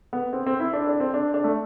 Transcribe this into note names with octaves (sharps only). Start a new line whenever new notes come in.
B3
C4
C4
E4
D4
D4
C4
D4
D4
A3